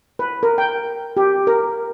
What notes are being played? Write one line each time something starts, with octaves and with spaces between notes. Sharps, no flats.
B4
A#4
G5
G4
A#4